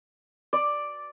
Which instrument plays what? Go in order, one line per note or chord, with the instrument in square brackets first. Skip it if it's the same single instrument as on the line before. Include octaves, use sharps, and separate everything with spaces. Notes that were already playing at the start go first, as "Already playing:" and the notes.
[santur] D5